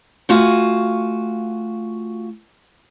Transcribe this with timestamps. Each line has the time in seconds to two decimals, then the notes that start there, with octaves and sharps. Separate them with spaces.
0.29 A3 F4 F#4 F5 G#5